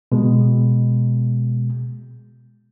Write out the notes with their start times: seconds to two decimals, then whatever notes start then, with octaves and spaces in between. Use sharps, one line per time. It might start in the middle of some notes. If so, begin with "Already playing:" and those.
0.12 B2 G#3